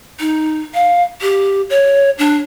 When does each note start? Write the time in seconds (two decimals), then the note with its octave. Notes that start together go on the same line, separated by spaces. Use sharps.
0.20 D#4
0.74 F5
1.21 G4
1.70 C#5
2.18 D4